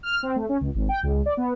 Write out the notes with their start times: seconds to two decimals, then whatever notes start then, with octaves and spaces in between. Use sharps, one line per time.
0.03 F6
0.23 C4
0.36 A3
0.49 C#4
0.61 C#2
0.75 G#1
0.89 G5
1.03 C#2
1.26 D5
1.37 B3